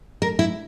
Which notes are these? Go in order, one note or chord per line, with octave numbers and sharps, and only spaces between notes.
A#4
E4